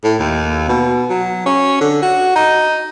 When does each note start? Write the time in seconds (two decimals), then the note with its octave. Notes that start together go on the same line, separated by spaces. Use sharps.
0.04 A2
0.19 D#2
0.69 B2
1.10 F#3
1.46 C#4
1.81 D3
2.02 F#4
2.36 D#4